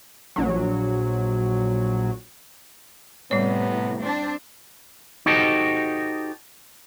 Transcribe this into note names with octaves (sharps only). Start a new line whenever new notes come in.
A#1 F#3
A2 C3 G3 B3 C#5
C4 D4 C5
D#4 F#4 G4 A4 C5 D#5